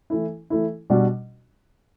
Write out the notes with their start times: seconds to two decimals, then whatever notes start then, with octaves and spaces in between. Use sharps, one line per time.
0.10 E3 A3 E4
0.50 E3 A3 E4
0.90 B2 G3 D4 F#4